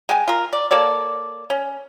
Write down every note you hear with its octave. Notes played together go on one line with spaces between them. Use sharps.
G#3 G5 G#5
F4 A#4
D5
A#3 A4 C#5 D5
C#4